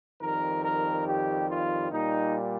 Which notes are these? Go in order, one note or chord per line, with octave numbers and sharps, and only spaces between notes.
F2 D#3 G3 A#4
A#4
G4
F4
A#2 G3 D#4